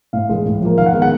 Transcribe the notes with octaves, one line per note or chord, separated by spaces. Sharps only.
A2 F5
E3 G#3
A2
F3 A#3
D#3 F5
F#5
G#3 B3
F#5